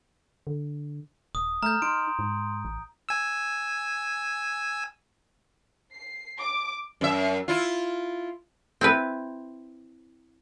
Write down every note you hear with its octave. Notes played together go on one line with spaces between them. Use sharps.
D3
D#1 D#6
A3 A#5 F6 G6
D#4 C6 D7
G#2
A1
G#5 E6
C7
D6
F#2 E5
E4 F4
C4 E4 B4